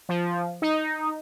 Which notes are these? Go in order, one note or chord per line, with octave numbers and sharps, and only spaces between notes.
F3
D#4